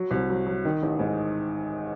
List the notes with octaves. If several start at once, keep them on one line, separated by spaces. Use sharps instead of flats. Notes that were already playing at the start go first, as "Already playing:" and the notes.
Already playing: F#3
C2
F#3
F#3
D#3
A1
G#2